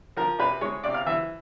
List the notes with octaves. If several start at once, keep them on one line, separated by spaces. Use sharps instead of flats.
F3 A#4
C3 B4
G#3 C#5
C3 D5
F5
E3 E5